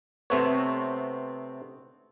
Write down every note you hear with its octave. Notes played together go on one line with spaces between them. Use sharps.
C3 A3 B3 C4 C#5